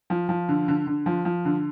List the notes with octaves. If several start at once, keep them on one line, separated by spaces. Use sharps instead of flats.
F3
F3
D3
D3
D3
F3
F3
D3